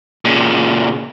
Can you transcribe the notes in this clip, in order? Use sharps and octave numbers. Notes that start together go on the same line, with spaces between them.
A#2 C#3